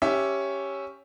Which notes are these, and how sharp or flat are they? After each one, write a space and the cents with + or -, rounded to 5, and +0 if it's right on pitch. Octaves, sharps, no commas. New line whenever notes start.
C#4 +0 G4 +0 E5 +0